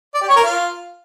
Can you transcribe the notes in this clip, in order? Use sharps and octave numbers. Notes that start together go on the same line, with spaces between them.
D5
G4
C#5
A#4
F4